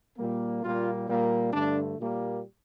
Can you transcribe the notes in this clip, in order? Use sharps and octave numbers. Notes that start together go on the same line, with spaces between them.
A#2 G3 A#3
A#2 G3 A#3 F4
A#2 G3 A#3
G2 D3 A3 D4
A#2 G3 A#3